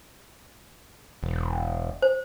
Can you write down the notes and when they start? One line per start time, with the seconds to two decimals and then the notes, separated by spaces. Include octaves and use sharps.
1.23 E1
2.02 C5